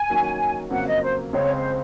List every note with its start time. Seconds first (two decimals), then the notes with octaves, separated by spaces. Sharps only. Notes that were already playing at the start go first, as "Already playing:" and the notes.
Already playing: G#5
0.10 D#3 F#3 A#3 C#4 F#4
0.71 F2 C#3 F#3 A#3 F#5
0.87 D#5
1.02 C5
1.32 C#2 C#3 G#3 C4 C#5
1.54 C5